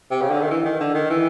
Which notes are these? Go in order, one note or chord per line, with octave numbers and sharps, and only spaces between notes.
C3
C#3
D3
D#3
E3
D#3
D3
D#3
E3